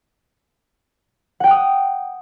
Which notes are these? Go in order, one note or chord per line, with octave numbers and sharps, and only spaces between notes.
F#5 G5 D#6 F#6